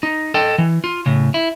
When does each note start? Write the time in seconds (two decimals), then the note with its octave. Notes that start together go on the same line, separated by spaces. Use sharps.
0.03 D#4
0.34 A4 D#5 G5
0.58 E3
0.84 F4
1.06 A2 C#3
1.34 E4